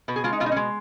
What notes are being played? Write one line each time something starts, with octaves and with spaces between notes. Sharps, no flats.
B2 B4
G#4
G#3 F4
D#4
B2 F4
D#4
C#4
G#3